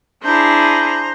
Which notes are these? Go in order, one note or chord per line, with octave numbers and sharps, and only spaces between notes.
D4 E4 G#4 C5 A#5